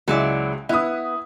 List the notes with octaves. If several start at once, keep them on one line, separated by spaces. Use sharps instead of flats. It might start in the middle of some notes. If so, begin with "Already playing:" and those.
C#2 F#3 G#3 E4 D5
B3 E4 B4 D#6